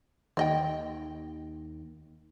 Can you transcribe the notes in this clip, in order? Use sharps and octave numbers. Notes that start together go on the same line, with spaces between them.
D#2 C4 D#5 G5